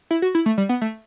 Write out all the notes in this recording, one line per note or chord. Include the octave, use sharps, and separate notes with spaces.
E4
F#4
E4
A3
G3
B3
A3